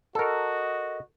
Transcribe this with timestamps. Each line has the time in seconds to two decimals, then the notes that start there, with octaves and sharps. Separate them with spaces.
0.15 F#4 A4 A#4 D#5